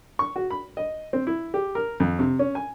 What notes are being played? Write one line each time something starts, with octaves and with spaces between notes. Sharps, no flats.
C#6
F#4
B5
D#5
C4
E4
G4
A#4
F2
C3
C#4
G#5